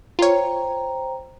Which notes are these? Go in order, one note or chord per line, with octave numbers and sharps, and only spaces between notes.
F4 C5 C#5 G5 A#5